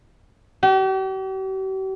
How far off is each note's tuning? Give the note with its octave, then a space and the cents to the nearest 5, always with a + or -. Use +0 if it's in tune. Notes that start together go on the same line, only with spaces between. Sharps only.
G4 -45